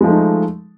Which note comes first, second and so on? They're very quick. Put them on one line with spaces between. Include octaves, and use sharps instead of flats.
G#3 F3 A3 D#4